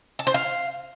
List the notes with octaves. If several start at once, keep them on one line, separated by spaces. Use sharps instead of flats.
A5
C5
F5